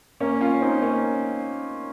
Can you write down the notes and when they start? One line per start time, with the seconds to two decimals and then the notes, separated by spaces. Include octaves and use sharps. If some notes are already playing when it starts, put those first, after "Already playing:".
0.20 A#3 C#4
0.41 C#4 F4
0.62 C4 D#4
0.82 A#3 C#4